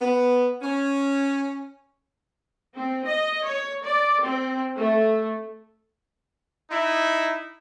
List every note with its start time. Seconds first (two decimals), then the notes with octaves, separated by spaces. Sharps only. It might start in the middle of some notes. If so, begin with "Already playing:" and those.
0.01 B3
0.62 C#4
2.76 C4
3.07 D#5
3.45 C#5
3.85 D5
4.23 C4
4.77 A3
6.70 D#4 E4